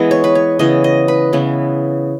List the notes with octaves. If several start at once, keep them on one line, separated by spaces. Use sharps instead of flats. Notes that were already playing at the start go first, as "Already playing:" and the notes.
Already playing: E3 G#3 B3 D#5
C#5
B4
C#5
C#3 E3 B3 D#5
D#5
B4
C#3 E3 B3